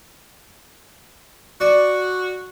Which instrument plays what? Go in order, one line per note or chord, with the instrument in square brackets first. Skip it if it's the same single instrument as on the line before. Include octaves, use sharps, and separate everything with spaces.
[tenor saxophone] F#4 [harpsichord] D5